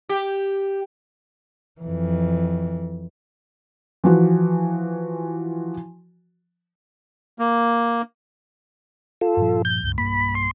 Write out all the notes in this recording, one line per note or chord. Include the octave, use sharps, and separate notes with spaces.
G4
F2 E3
E3 F3 F#4
A#3
F4 A4
G2 A#2 F3
G6
C#2 G2
B1 G2 A#3 B5
C6